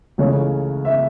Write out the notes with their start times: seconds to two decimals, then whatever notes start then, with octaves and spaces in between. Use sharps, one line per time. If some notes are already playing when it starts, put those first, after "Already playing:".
0.18 C#2 C#3 E3 A3 C#5
0.85 E5